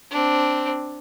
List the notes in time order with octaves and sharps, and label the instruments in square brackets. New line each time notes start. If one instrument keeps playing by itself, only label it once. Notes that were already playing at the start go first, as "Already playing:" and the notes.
[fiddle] C4 D4